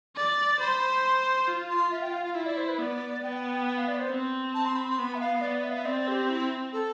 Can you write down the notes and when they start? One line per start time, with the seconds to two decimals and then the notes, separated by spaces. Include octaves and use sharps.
0.16 D5
0.60 C5 B5
0.82 B5
1.04 C6
1.48 F4
1.70 C6
1.91 E5
2.02 G5
2.13 F5
2.25 F5
2.35 E4 E5
2.46 D5
2.57 C5
2.68 B4
2.79 B3 D5
3.23 B3 G5
3.67 G5
3.77 F5
3.88 D5
3.99 C5
4.10 C4
4.54 A5
4.65 C6
4.76 B5
4.87 C6
4.98 B3 B5
5.14 E5
5.20 F5
5.41 B3 D5
5.64 E5
5.70 F5
5.77 E5
5.85 C4 D5
6.08 G4
6.29 E4
6.73 A4